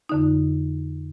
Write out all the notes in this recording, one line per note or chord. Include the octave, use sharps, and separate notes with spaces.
F2 D3 D#4